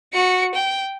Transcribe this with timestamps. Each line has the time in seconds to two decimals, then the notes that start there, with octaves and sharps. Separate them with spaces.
0.13 F#4 C#7
0.54 G5